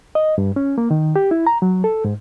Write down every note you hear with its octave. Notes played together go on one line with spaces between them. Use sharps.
D#5
G2
C#4
A#3
D#3
G4
E4
A#5
F#3
A4
G#2